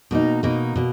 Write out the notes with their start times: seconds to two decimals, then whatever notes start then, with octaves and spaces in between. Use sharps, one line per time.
0.11 B2 A#3 D#4
0.43 B2 A#3 D#4
0.76 B2 A#3